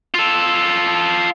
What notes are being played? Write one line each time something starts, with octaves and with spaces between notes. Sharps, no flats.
F4 A4